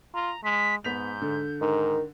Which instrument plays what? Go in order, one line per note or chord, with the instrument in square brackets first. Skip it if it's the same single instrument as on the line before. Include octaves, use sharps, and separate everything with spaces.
[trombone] F4 [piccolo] A#5
[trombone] G#3 [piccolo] B6
[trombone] G#2 [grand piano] B3 B6 F7 [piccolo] G6
[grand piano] D3
[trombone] G#2 [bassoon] D#3